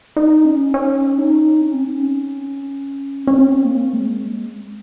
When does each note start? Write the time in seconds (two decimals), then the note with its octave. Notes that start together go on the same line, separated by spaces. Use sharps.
0.17 D#4
0.45 C#4
0.74 C#4
1.18 D#4
1.61 C#4
1.74 C4
1.86 C#4
3.27 C#4
3.36 C4
3.65 A#3
3.93 G#3